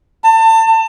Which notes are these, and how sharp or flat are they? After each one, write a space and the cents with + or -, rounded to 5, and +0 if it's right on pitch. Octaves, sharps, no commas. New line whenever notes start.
A5 +30